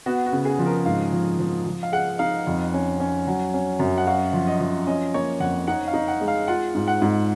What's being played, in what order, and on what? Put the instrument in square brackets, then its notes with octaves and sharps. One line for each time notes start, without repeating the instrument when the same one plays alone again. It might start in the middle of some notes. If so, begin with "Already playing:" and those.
[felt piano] B3 [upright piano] F#4
[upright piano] F#4
[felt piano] C#3
[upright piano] G#4
[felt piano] F3
[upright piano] A#4
[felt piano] G#2 [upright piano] F5
[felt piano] F3
F3
F3
[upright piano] F5
[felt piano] G#4 [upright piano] F#5
[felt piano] D#4 [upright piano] F5
[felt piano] F2
C#4
C#4
F#3
C#4
F#2
[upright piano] F#5
[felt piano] F#4 [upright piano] F5
[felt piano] F3
[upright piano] D#5
[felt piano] F3
[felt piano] C#4 [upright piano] D#5
[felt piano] A#3 [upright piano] C#5
[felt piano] F2 [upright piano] F#5
[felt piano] D#4 [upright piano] F#5
[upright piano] F5
[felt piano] D#4
[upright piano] F#5
[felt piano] G#3
[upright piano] F5
[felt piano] F4 [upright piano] F#5
[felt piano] G#2
[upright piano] F#5
[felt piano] G#2